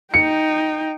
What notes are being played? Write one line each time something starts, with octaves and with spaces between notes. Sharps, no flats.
D#4 G5 C#7